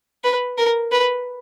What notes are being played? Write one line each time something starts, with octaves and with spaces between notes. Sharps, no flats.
B4
A#4
B4